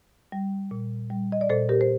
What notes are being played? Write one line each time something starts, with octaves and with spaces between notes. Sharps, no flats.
G3
A#2
G3
D#5
D5
A#2 A4 C5
G4 A#4
C5